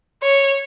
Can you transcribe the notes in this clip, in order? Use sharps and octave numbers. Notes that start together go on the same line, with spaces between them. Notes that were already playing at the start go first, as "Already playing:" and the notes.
C#5